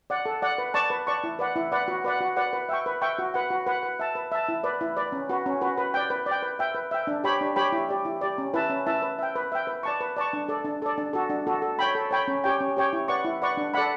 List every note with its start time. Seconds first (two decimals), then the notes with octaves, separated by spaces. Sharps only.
0.10 D5 F#5
0.26 A4
0.42 D5 F#5
0.58 B4
0.74 D5 A5 C#6
0.90 B4
1.07 D5 A5 C#6
1.24 E4
1.39 B4 D5 F#5
1.56 E4
1.72 B4 D5 F#5
1.88 F#4
2.05 B4 D5 F#5
2.21 F#4
2.36 B4 D5 F#5
2.53 B4
2.69 E5 G5 C#6
2.86 B4
3.02 E5 G5 C#6
3.19 F#4
3.34 B4 F#5
3.50 F#4
3.66 B4 F#5
3.83 B4
3.99 E5 A5
4.15 B4
4.32 E5 A5
4.48 E4
4.64 B4 D5
4.81 E4
4.97 B4 D5
5.12 C#4
5.29 F#4 B4
5.46 C#4
5.61 F#4 B4
5.78 B4
5.94 D5 G5
6.10 B4
6.26 D5
6.31 G5
6.42 B4
6.59 E5 G5
6.75 B4
6.91 E5 G5
7.07 D4
7.24 G4 C#5 G5 B5
7.41 D4
7.56 G4 C#5 G5 B5
7.72 E4
7.89 G4 D5
8.05 E4
8.21 G4 D5
8.38 C#4
8.54 E4 B4 E5 A5
8.70 C#4
8.86 E4 B4 E5 A5
9.02 B4
9.19 E5 G5
9.36 B4
9.52 E5 G5
9.67 B4
9.83 D5 A5 C#6
10.01 B4
10.16 D5 A5 C#6
10.33 D4
10.49 A4 D5
10.65 D4
10.82 A4 D5
10.98 D4
11.13 F#4 A4
11.30 D4
11.47 F#4 A4
11.62 A4
11.79 C#5 G5 B5
11.95 A4
12.11 C#5 G5 B5
12.28 C#4
12.44 G4 C#5 G5
12.60 C#4
12.77 G4 C#5 G5
12.93 E4
13.08 B4 D5 F#5 C#6
13.24 E4
13.42 B4 D5 F#5 C#6
13.57 D4
13.74 A4 D5 F#5 B5